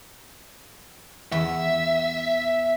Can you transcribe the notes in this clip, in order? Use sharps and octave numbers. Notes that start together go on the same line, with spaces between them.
E2 E5